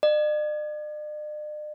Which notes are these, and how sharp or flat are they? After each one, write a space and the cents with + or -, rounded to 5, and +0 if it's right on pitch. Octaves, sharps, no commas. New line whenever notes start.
D5 +45